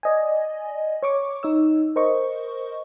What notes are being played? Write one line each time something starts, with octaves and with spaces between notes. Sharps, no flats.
D5 D#5 G#5
C#5 C#6 D6
D#4 C#5 E6
A#4 C5 D#5 C#6